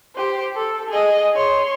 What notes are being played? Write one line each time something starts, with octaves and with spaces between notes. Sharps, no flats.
G4 C5
A4
G#4 D#5
C#5 C6